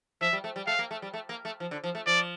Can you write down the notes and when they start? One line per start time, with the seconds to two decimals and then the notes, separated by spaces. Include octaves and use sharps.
0.21 F3 E5
0.33 G3
0.44 A3
0.56 G3
0.67 A3 F5
0.79 A#3
0.91 A3
1.02 G3
1.14 A3
1.29 A#3
1.45 A3
1.60 F3
1.71 D3
1.84 F3
1.95 A3
2.06 F3 D5